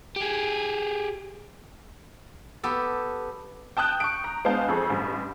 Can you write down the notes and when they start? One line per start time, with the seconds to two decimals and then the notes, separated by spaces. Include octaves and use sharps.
0.16 G4 G#4
2.64 B3 G4 A4
3.77 G5 A5 D#6 F#6 G6
4.00 C#6 D7
4.24 A#5
4.45 G#3 B3 D4 F5 A5 G6
4.68 F2 G#4 A4 C#6
4.90 A1 G2